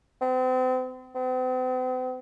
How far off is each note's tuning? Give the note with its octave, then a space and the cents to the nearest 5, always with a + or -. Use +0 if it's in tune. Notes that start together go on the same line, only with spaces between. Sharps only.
C4 -35
C4 -45